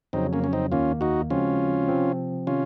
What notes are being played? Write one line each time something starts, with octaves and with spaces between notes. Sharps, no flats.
F2 C#3 F#3 C4 D#4
A#3 C#4
C#4
C4 D#4
D#2 D#3 A#3 C#4 F4
D#4 F#4
C#3 F3 G#3 C4 C#4 F4 F#4
C3 F3 C4
C3 D#3 C#4 F4